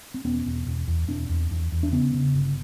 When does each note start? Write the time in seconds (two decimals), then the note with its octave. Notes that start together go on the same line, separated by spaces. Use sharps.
0.14 C4
0.25 E1 B3 C#4
0.46 E1
0.66 E1
0.88 E2
1.08 E1 C4 D4
1.29 E2
1.51 E2
1.72 E2
1.83 D4
1.92 C#3 B3 C#4
2.14 C#3
2.34 G1